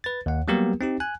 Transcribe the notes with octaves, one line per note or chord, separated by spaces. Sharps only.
B4 A6
D#2 F#5
F#3 G3 A#3 B3 G4 A#4
C4 D#4 G4
G#5 F#6